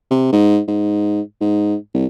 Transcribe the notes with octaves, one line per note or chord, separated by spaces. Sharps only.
C3
G#2
G#2
G#2
C2